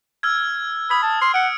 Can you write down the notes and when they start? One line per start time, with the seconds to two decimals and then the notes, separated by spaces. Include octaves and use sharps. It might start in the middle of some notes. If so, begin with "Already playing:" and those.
0.23 E6 F6 G#6
0.90 B5 D#6 G#6
1.03 A5
1.21 C6 F6
1.34 F#5 C#7 D7